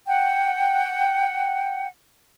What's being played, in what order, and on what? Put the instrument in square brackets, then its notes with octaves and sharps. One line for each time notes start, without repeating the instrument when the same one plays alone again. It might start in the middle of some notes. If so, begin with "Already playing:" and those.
[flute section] F#5 G5